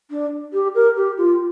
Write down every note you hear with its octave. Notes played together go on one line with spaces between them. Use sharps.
D4
G4
A#4
G4
F4